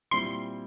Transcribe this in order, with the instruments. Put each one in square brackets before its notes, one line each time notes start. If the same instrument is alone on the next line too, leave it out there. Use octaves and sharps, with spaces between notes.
[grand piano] A#2 G3 C4 E4 [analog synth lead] C6